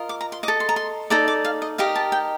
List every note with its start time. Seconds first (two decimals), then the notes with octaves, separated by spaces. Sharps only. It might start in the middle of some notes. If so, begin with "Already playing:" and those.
Already playing: F4 A#4 D#5
0.09 D6
0.21 A#5
0.32 C6
0.43 D#5 D6
0.48 A4
0.60 C6
0.69 A#5
0.76 C6
1.10 D#4 A4 D5 A#5
1.28 D6
1.45 F5
1.62 D#5
1.78 D#4 G4 A#4 D#5 F5
1.96 A5
2.12 G5